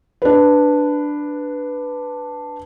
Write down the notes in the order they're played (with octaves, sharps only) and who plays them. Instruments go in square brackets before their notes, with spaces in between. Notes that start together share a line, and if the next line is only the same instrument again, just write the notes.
[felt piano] D4 B4